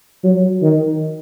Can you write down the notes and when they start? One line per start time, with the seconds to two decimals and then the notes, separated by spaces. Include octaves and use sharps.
0.24 F#3
0.62 D#3